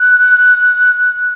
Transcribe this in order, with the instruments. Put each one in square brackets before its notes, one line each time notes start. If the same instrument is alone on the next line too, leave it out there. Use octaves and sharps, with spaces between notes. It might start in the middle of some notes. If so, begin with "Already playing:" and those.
Already playing: [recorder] F#6